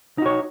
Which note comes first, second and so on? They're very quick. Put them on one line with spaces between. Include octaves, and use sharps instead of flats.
D#4 F#4 C#5